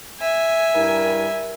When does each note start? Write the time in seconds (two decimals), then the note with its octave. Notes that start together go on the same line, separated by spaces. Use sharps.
0.20 E5 G#5
0.74 G2 E4 A#4